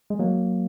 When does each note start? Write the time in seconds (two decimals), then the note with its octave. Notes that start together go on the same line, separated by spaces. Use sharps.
0.10 G#3
0.19 F#3 A#3